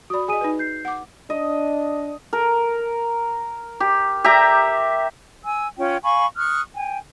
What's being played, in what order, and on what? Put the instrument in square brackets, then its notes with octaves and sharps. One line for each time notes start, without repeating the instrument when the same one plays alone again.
[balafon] F#4 D5 [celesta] B5 D#6
[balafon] G#4 D#5 [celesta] G#5 D#6 D#7
[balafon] D#4 B4
[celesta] G6 C7
[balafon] F#5 D6
[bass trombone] D4 [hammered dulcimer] D#5
[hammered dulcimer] A#4
G4
G4 E5 A#5
[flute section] G#5 E6
C#4 F4 G5
F5 G#5 B5 C#6
C#6 D#6 F6 F#6
G5 G#5